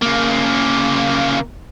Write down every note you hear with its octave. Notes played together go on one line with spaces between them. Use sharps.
C#3 A#3